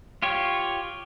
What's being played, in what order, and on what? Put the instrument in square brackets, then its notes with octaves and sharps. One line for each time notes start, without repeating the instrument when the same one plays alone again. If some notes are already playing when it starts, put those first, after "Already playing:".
[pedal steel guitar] F4 G4 C#5